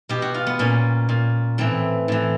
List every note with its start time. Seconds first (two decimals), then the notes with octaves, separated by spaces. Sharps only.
0.09 B2 G4
0.22 F#4
0.34 F4
0.47 B3
0.59 A#2 C#4
1.09 A#2
1.58 A2 E3 C4
2.08 A2 E3